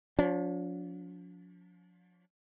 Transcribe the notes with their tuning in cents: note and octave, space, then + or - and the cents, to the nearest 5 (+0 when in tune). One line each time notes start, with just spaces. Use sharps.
F3 +40 D4 -40